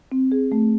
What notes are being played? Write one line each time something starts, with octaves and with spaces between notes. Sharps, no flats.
C4
G#4
A3